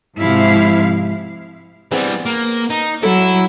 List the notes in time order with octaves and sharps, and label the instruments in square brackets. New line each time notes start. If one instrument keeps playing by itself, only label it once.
[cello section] G#2 C3 F3 E4 F5
[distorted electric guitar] E3 G3 [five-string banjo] B3 C4 G#4
[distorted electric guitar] A#3
D#4
[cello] F#3 [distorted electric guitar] E4 [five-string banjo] A4